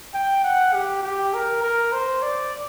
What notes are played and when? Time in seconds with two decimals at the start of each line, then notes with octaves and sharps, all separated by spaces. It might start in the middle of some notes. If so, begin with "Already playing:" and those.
0.14 G5
0.44 F#5
0.74 G4
1.03 G4
1.34 A#4
1.62 A#4
1.92 C5
2.22 D5